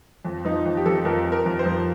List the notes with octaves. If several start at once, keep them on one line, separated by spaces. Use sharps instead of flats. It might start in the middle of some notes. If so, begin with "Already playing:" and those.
F2
F3 D#4
F2
G4
F2 A4
F2 A#4
F2
A#4
F2
C5
F3